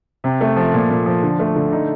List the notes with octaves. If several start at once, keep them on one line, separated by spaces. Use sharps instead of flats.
C3
A3
F3
A#2
A#2
F3
D3
A3
D3
D#4